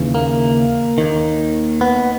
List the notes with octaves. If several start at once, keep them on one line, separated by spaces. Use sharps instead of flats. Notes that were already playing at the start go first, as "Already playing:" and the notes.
Already playing: D#2 C#3 E3
A#3
D#2 D#3
B3